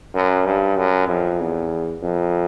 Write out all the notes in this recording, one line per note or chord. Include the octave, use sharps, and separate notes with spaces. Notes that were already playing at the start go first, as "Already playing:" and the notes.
F#2
G2
F#2
F2
E2
F2